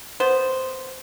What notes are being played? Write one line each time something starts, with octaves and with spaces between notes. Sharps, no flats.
B3 C5